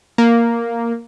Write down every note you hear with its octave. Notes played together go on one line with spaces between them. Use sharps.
A#3